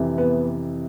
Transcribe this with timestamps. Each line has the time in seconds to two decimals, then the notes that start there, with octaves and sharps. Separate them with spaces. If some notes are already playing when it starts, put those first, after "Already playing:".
Already playing: F2 C3 E3
0.18 B3